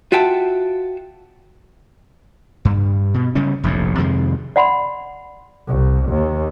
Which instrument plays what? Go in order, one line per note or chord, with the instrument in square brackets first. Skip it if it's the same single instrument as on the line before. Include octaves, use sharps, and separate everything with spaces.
[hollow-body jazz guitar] F4 F#4 E5 G5 A5
[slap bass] G2
B2
C#3 G3 C#4
F1 A#1 F2 A2
F2 C3 D#3 G#3
[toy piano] D5 F#5 B5 C6
[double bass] C2
D#2